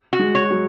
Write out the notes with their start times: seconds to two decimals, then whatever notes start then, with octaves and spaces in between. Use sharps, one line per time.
0.13 F#4
0.19 G#3
0.35 C#5
0.51 F#3